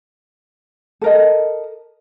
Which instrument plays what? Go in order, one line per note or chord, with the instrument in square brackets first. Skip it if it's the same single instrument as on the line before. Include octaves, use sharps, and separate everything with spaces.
[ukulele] A4 A#4 D#5